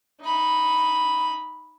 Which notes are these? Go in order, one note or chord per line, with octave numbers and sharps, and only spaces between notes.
D#4 B5